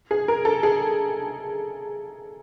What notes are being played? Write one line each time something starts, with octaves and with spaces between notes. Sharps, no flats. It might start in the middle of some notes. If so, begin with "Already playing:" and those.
G#4
A#4
A4
G#4